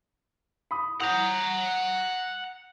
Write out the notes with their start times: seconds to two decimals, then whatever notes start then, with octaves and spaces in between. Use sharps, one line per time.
0.71 B5 D#6
1.00 F#5 A#5 D#6 G6 F7